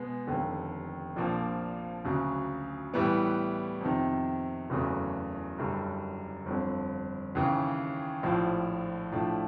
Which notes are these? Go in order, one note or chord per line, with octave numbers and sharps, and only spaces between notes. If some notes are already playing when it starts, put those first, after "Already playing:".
Already playing: B2 G#3 B3
F1 D#2 D3
A#1 A#2 F3 A#3 D4
D2 C#3 F#3
A2 E3 G3 B3
F2 C3 D#3
F#1 E2 C#3 F#3 A3
F#1 F#2 D3 G3
G1 F2 D3
D#2 C#3 E3
A#1 A2 F3
A2 F3 A3 D4